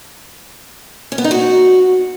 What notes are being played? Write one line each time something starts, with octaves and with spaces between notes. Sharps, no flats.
C#4
B3
D#4
F#4